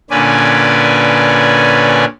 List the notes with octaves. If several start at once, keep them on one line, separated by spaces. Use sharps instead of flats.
A#2 D3 C#4 B4 D5 G#5